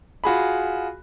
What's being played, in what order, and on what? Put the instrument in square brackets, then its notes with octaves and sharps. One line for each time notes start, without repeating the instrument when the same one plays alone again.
[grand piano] F4 F#4 G#4 B5